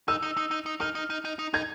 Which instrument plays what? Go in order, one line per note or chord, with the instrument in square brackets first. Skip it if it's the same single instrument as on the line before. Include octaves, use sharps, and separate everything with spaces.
[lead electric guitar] D#4 [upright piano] E6
[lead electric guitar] D#4
D#4
D#4
D#4
[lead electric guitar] D#4 [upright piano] F6
[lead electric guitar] D#4
D#4
D#4
D#4
[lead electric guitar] D#4 [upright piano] G#6